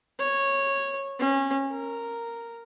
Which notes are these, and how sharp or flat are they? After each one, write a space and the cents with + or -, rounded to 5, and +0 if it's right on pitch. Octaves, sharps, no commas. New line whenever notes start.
C#5 -10
C#4 -25
A#4 -5